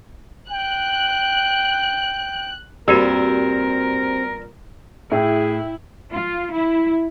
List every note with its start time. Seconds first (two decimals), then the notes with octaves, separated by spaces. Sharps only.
0.50 G5 F#6
2.88 G2 A#2 C4 F#4 G4 A#4 E6
5.12 A2 E4 G#4 E5 G5
6.10 F4
6.53 E4